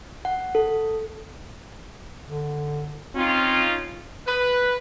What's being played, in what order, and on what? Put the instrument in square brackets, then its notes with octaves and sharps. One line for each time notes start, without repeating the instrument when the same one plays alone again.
[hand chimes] F#5
A4
[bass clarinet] D3
[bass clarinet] C4 [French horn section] C#4 D#4 F4
[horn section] B4